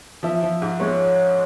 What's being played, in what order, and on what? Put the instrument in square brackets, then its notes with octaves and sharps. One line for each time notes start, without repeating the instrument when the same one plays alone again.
[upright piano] F3 [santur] E5
[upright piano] F3
G#2
[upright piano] G#3 [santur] C#5